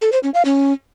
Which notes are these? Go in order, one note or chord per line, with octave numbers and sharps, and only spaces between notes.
A4
C5
C#4
F5
C#4